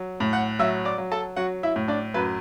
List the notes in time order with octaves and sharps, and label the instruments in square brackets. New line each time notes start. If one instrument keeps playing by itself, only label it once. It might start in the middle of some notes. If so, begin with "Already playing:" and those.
Already playing: [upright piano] F#3
A2
F#5 F#6
F#3 E5 E6
D5 D6
F#3
A4 A5
F#3 F#4 F#5
E4 E5
A2
D4 D5
F#2 B4